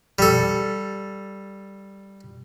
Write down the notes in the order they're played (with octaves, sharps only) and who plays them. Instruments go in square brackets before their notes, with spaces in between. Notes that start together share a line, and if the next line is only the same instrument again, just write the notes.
[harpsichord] G3 A4